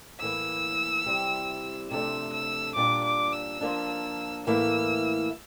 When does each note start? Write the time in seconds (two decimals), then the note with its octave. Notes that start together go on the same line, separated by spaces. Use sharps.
0.21 A2 E3 A#3 E6
1.06 C3 G3 C4 E4
1.91 C3 F3 A3 D4 E6
2.34 E6
2.76 A#2 G3 D4 D6
3.05 D6
3.33 E6
3.61 F3 A#3 D4
4.47 A2 E3 A#3 E4 E6